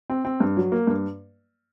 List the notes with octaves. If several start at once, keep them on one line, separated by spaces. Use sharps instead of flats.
C4
C4
G2
F#3
A#3
G2